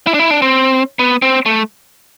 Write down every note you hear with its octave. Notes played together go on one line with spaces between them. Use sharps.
E4
D4
E4
D4
C4
B3
C4
A3